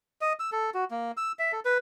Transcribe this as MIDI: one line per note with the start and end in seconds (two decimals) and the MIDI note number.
0.21 0.33 75
0.39 0.50 88
0.52 0.70 69
0.74 0.85 66
0.91 1.12 58
1.17 1.32 88
1.39 1.52 76
1.52 1.60 69
1.65 1.78 71